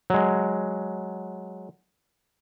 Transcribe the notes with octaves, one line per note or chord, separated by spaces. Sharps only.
F#3 G#3